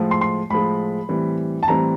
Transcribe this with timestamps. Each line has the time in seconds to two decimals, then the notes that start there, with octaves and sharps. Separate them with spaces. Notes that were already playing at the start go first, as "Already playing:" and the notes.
Already playing: A2 F3 G#3
0.11 C6
0.21 C6
0.50 A2 F3 G#3 B5
1.09 A2 E3 G3 C4
1.63 A5
1.67 A2 E3 G3 C4 A#5